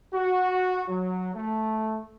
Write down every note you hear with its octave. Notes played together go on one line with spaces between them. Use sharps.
F#4
F#3
A3